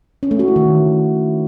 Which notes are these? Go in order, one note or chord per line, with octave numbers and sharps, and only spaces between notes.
C#4
A3
F#4
E4
D#3